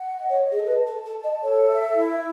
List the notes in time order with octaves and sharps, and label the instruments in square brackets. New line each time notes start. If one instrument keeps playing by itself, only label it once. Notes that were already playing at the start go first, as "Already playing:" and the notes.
Already playing: [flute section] F#5
D#5
[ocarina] C#5
[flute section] D#5
[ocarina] G#4
A4
[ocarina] B4 [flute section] A5
[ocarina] A4
[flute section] A5
[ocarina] A4
[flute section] A5
[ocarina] D#5
[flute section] A4 [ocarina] C#5
[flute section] E5
E4